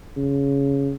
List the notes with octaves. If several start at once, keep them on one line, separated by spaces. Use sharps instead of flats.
C#3